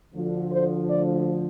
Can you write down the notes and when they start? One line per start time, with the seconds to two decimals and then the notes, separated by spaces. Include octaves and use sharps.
0.13 D2 D3 F3
0.51 C5
0.89 D5